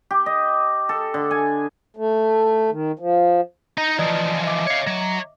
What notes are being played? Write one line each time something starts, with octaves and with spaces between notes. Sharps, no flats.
G4
D#5
A4
D3
G#5
A3
D#3
F3
D#4 D#5 A#5
E3 F3 D5 D#5 D#6
D#5 E5 D6
C#5 F5
F#3